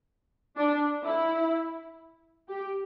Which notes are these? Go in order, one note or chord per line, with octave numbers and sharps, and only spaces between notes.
D4
E4
G4